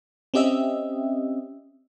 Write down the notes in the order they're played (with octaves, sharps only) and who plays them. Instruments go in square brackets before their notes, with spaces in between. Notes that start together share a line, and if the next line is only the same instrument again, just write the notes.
[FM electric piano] C4 C#4 G4 D#5 E5